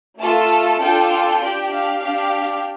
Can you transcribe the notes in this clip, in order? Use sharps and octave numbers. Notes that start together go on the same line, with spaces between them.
A3 F4 A4 A5
D4 F4 A4 G5
G5
D4 G4
F5
D4 G4